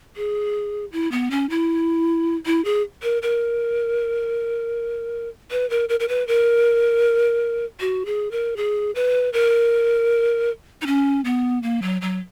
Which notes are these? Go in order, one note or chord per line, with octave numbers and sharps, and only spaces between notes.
G#4
E4
B3
C#4
E4
E4
G#4
A#4
A#4
B4
A#4
A#4
A#4
B4
A#4
F#4
G#4
A#4
G#4
B4
A#4
D#4
C#4
B3
A#3
F#3
F#3